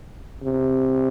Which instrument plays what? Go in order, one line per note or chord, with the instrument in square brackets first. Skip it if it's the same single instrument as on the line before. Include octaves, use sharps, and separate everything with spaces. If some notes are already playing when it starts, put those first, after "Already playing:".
[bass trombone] C3